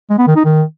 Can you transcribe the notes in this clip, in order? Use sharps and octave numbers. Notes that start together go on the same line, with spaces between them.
G#3
B3
D#3
D#4
D#3